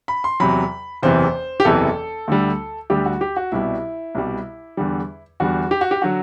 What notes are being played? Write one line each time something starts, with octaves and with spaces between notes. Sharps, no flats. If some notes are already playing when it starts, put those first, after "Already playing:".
B5
C6
E2 C3 F#3 B5
F#1 E2 C3 E3 C5
G4
F#1 E2 C3 E3 A4
D2 D3 G3
D2 D3 G3 G4
F#4
G4
F#4
C2 B2 G3 E4
C2 B2 G3
E2 D3 G3
E2 D3 G3 F#4
G4
F#4
G4
D3 F#3 F#4